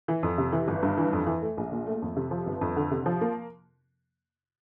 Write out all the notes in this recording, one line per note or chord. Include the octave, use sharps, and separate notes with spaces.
E3
F2
C3
E3
G1
G2
E3
F2
E3
A3
A#1
A#2
A3
F2
C3
F3
G1
F2
D3
C3
F3
A#3